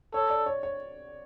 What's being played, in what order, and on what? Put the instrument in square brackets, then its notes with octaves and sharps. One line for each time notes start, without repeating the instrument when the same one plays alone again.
[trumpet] A4 [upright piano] C#5
[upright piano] D5
C#5
C#5